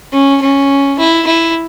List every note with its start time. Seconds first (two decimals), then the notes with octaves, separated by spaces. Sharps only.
0.13 C#4
0.41 C#4
0.99 E4
1.27 E4